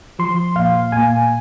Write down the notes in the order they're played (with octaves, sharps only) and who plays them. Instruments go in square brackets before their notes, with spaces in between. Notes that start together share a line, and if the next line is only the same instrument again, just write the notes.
[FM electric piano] F3 C6
A#2 F5
A#2 G#5